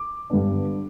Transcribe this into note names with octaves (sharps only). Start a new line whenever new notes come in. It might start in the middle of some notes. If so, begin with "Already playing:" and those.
Already playing: D6
G2 D3 B3 D4